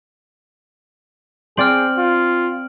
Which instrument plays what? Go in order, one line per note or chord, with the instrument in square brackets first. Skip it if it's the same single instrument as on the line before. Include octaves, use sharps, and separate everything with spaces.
[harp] C4 C5 D5 [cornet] G#4 [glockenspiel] F6 D7 F#7
[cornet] F4